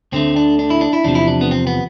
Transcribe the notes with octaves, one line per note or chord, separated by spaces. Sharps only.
D2 D3 A3 C4
D4
D4
E4
D4
E4
E2 C3 F3 D4
E4
D4
B3
C4
B3